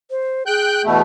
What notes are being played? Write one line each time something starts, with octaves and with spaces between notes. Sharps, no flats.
C5
G#4 G5 F#6 G6
E2 B2 A3